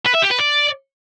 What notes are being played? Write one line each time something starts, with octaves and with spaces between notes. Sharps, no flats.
B4
E5
G4
B4
D5